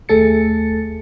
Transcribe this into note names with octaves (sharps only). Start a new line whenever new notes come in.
D#2 A3 G#4 A4 A6 C#7